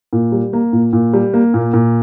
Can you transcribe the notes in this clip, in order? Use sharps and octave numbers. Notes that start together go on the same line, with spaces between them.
A#2
G3
A#3
A#2
A#2
G3
A#3
A#2
A#2